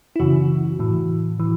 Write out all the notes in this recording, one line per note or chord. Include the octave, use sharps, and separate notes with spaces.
E4
F#2 C#3 E3 F#4
A2 E3
E3